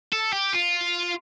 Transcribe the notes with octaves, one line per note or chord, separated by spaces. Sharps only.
A4
G4
F4